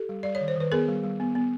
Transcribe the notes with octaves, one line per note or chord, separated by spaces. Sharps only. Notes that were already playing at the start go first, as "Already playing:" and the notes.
Already playing: G4 A4
G3
G3 D5
C#5
D#3
C5
D#3 B4
B3 G#4 A#4
G3
G3
B3
B3